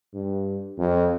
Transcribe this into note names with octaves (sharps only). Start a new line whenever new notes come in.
G2
F2